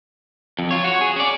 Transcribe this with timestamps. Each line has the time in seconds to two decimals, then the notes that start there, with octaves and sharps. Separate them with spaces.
0.59 F2
0.71 F4 C#5
0.84 F#4 C#5
1.01 G#4
1.16 C#4 D5